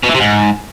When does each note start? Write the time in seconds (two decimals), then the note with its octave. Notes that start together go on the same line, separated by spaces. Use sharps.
0.04 B2
0.09 E3
0.15 C3
0.20 G#2